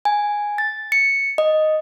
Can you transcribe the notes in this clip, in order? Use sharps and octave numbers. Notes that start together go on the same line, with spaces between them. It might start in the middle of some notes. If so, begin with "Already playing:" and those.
G#5
A6
C#7
D#5